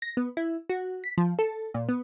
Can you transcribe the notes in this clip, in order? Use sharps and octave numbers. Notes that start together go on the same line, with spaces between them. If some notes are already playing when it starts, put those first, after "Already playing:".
A#6
B3
E4
F#4
B6
F3
A4
A#2
B3